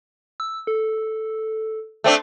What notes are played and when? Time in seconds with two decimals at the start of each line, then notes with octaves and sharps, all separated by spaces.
0.40 E6
0.67 A4
2.04 A3 C4 D4